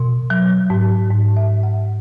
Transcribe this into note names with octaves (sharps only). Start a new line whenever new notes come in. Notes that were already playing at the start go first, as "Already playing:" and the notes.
Already playing: B2
F#3
G#2
G#2
E5
G#2
F#5